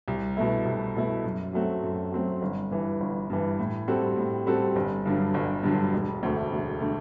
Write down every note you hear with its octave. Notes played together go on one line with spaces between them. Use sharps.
C2
B2 A3 E4
C2
B2 A3 E4
F#2
F#3 A3 C4 F#4
F#2
F#3 A3 C4 F#4
G1
G2 E3
G1
G2 E3
A2
G3 C4 F#4 A4
A2
G3 C4 F#4 A4
G1
G2 D3 F#3
G1
G2 D3 F#3
E1
D2 D3 A3
E1
D3 A3